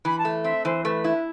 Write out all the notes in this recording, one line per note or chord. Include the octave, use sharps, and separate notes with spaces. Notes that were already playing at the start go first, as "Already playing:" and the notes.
E3 B5
A5
A3
C4 E5
E3 C5
A3 B4
E4